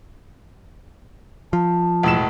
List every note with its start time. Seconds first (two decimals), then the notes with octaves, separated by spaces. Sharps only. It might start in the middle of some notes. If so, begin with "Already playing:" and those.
1.53 F3 A5
2.03 E1 A2 E7